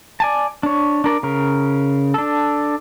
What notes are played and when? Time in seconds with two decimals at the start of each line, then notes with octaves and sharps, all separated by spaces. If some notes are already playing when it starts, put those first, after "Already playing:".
0.20 D5 G#5 A5
0.63 D4 C#5
1.04 D4 A#4 D5
1.23 C#3 A#4
2.14 D4 A4